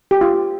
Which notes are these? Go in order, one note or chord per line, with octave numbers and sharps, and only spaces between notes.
G4
F4